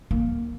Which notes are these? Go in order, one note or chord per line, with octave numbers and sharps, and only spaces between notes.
A#3